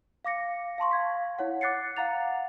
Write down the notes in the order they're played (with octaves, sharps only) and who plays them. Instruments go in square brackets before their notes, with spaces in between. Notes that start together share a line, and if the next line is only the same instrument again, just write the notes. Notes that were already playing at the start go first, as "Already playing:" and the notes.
[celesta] F5 D6 A#6 C#7
F5 A5 C6 C#6
F5 G#6 B6
E4 C#5 F#5
D6 F#6 A6 C7 C#7
F5 F#5 A#5 A6 F7